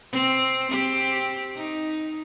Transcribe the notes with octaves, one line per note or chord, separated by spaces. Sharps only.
C4
C4 G4
D#4